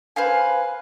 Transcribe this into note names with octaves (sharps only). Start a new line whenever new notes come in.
B4 C5 F5 G#5